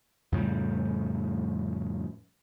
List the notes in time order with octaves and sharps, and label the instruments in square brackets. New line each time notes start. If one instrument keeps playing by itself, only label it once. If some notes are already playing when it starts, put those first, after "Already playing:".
[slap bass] F2 A2 C#3 G3